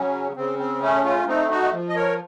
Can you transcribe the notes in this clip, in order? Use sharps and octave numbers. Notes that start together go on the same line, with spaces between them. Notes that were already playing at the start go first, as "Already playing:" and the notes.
Already playing: C#3 F#3 C#4
C#3 C4
C4
A3 C#4
C#4 F4
A3 C4 D#4
D#4 F#4
F3
D#5
A#4 C#5